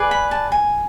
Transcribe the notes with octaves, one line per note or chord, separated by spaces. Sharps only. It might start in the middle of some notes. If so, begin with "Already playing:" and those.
Already playing: G#4 B4 D5
B5
A5
G#5